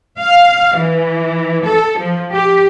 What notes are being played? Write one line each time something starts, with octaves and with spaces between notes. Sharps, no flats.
F5
E3
A4
F3
G4